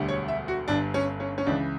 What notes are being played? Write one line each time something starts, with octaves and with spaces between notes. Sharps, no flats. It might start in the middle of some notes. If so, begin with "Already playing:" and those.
Already playing: E1 D2 D3 G3
C#5
E5
F#4
G1 G2 D3 D4
C#4
C#4
C#4
C#2 C#3 E3 D4